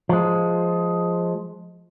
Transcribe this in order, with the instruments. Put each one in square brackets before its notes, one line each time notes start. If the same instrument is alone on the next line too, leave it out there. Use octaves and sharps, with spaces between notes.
[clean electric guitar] F3 G#3